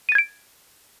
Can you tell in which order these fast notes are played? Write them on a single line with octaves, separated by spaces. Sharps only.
D#7 A6 G#6 D7